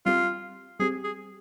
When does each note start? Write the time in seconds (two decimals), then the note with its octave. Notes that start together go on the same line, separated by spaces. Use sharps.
0.06 G3 C4 F4 G4
0.80 G3 C4 G4 G#4
1.04 G#4